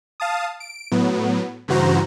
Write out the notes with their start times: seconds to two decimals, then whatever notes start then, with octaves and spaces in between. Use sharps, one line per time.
0.20 F5 A5 D#6
0.60 D7
0.92 A2 F#3 B3
1.68 G2 C#3 E3 F#4 C5 A#5